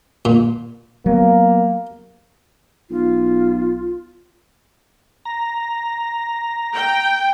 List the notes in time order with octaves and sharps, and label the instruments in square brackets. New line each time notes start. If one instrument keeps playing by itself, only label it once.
[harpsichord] A#2
[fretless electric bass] F#3 B3 [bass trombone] A#3
[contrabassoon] B1 [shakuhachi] F4
[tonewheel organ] A#5
[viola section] G5